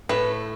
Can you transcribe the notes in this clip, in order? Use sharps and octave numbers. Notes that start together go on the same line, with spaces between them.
A2 A3 B4